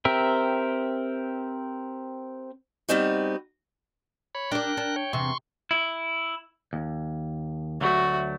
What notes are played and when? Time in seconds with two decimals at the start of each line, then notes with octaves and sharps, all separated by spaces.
0.05 C4 G4 A#4 E5
2.89 G3 B3 C4 D#4 F#4
4.35 C#5 B5
4.52 D4 A#4 D5 G5 F#6
4.77 D4
4.96 C#5 G5
5.13 E2 C3 C6 C#6
5.71 E4
6.73 D#2
7.81 D2 F#3 A3 F#4